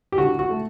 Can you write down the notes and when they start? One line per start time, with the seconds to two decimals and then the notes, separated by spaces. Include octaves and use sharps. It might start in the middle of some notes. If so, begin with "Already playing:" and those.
0.12 G4
0.18 D3 F#4
0.39 F#4
0.50 A3